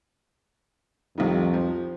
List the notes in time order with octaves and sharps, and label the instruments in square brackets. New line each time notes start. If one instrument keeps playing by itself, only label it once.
[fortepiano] C2 D#3 [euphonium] F2
[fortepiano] F3